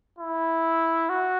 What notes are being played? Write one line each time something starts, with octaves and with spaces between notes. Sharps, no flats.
E4
F#4